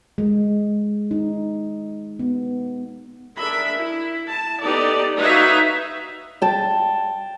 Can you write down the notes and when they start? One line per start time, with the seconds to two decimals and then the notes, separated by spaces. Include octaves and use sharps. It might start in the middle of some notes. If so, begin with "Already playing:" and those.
0.18 G#3
1.11 D#4
2.19 B3
3.37 D4 G#4 A#4 E5 B5
3.75 E4
4.29 A5
4.61 B3 D#4 G4 A4 D5
5.17 D#4 F#4 B4 C#5 E5 F5
6.42 G5 A5